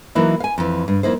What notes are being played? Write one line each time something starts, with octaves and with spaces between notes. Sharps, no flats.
E3 F#3 A#3 D#4 E4
F5 G#5
F2 E3
G2
F2 A#3 D#4 E4 C5